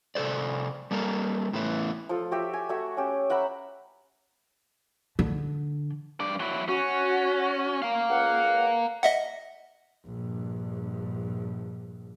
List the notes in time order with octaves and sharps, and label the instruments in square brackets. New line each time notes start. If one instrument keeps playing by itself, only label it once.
[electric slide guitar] C3 A4 C5 D5
G3 A#3 A4 A#4
A2 E3 A3 B3 E4
[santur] F3 A4
F#4 G4 E5
G#5
A3 F#4 E5
C#4 G4
E5 F#5 A#5 B5
[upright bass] D3
[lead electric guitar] G2 D5
F#3 E4
[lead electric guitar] C#4 [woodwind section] F#4
[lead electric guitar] A#4 F5
[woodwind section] C#2 F#5
[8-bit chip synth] D#5 E5 F#5
[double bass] A#1 G2